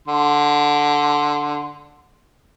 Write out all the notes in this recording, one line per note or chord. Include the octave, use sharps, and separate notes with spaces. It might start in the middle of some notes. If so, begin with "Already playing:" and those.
D3 C6